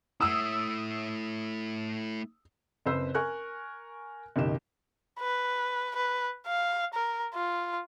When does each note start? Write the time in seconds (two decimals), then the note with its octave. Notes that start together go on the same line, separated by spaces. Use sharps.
0.21 A3 E4 D#6 E6
2.86 F#1 C4 B4 C5 E6
3.15 A#4 G#5 C#6 F#6
4.36 F#1 B1 D#3 G4 E7
5.20 B4
5.96 B4
6.46 F5
6.94 A#4
7.35 F4